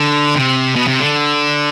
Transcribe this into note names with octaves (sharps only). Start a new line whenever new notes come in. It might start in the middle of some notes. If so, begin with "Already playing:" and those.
Already playing: D3
C3
B2
C3
D3